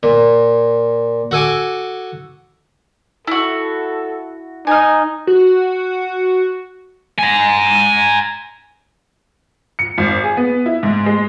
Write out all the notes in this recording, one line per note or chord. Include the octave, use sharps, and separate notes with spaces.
A#2
F#4 A4 G#5 D6
E4 F#4 A4
D#4 G#5 F6
F#4
G#5 A#5
C#7
G#1
G#4
B3
E4
G#2
G#3